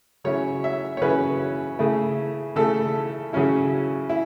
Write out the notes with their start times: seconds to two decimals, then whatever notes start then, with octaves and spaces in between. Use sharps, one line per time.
0.24 C#3 F#3 C#4 E4 C#5
0.64 E5
0.97 C#5
1.01 C#3 F#3 C#4 E4 B4
1.79 C#3 A3 E4
2.56 C#3 A3 E4 A4
3.33 C#3 F#3 C#4 E4
4.09 E4